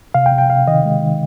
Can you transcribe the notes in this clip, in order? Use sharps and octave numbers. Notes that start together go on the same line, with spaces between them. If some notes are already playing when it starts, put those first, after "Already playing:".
C3 F5
G5
C3
G5
C3 F5
D#3 D#5
G#3
D#3